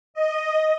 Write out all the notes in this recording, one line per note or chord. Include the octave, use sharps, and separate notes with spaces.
D#5